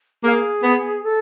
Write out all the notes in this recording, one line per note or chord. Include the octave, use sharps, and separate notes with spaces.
A#3 G#4
B3
A4